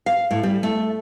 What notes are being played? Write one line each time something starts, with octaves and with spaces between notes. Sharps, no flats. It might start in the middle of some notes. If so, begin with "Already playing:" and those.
F5
A2
G3
A3